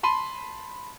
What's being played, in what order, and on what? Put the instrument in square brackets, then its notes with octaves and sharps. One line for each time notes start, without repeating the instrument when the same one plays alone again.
[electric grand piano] A5 B5 C6 D#7